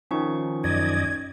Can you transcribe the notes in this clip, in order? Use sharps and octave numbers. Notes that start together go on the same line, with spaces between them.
D#3 F3 C#4 D#4 C#6
F#2 D5 D#5 G#6